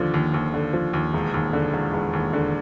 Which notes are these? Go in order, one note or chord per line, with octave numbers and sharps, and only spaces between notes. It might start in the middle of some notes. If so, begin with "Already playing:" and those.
Already playing: D#2 D3 F3
D#2
D#2
D3
F3
D#2
E1
D#2
D3
E1
E1
D#2
D3